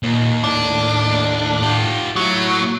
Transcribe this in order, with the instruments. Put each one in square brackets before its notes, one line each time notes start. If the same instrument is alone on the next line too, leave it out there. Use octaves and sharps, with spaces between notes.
[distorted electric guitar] D#2 [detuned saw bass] A#2
[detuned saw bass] A2 [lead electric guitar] D4
[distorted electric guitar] F4 G4
[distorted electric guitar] A2 A3 [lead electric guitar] F#3